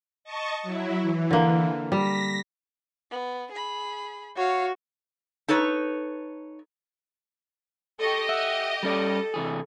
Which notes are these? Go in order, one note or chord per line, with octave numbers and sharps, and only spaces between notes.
D#5 A5 C#6
F#3 E4
E3
D3 A#3
G3 A#6 B6
B3
G#4 B5
F#4 C#5 F5
D#4 A4 B4 C#5
G4 A4 D#5 C#6
E5 F#5
G3 C#4 A4 D5
C3 E3 G#4